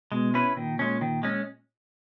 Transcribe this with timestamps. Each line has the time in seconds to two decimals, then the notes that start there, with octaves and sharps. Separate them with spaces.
0.12 B2 G#3
0.34 C#4 E4 B4
0.57 A#2 D#3
0.79 G#3 C#4
1.01 D#3
1.23 G#3 C#4